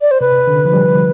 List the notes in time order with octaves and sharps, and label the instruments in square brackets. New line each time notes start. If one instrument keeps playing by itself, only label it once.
[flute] D5
C5
[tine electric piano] C3 [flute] B4
[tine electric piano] D3
F3
G3